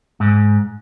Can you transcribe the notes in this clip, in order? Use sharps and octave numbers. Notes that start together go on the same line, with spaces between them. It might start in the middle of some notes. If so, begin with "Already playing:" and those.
G#2